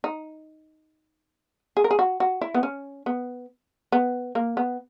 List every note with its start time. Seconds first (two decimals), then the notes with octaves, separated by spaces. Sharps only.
0.04 D#4
1.77 G#4
1.84 A#4
1.91 G#4
1.99 F#4
2.20 F#4
2.41 E4
2.54 B3
2.63 C#4
3.06 B3
3.92 B3
4.35 A#3
4.57 B3